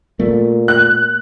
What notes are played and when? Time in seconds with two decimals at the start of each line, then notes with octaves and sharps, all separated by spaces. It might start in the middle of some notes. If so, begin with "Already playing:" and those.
0.20 A#2 A3
0.68 F#6